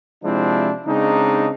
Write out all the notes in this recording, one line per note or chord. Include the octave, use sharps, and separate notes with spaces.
C3 F3 G#3 C4 D4 E4
C#3 G#3 C4 D4 D#4